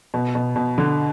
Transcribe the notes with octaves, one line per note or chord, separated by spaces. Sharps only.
B2
B2
B2
D3